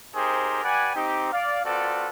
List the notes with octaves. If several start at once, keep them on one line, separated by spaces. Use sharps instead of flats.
C4 D#4 G4 G#4 A#4 C5
G4 B4 D5 F#5 G#5
C4 D#4 G4
D5 F5
C4 F4 F#4 A4 B4 D5